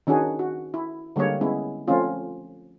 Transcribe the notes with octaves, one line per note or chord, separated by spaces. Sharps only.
D#3 C#4 D4 F#4 G#4
F#4
E4
D3 G3 G#3 A#3 C#5
G#3 B3 C#4 E4
F3 A3 C4 C#4 F4